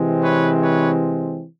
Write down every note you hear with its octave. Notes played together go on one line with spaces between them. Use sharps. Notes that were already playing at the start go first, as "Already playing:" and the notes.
Already playing: C3 E3 G#3 C4
B4 C#5
B4 C#5